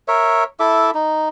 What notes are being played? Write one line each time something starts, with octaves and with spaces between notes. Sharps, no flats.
A#4 C#5 E5
E4 A4 E5 D6
D#4